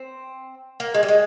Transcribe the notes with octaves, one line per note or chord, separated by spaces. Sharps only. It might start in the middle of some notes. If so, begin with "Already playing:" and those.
Already playing: C4
A#3
G#3
G3
G#3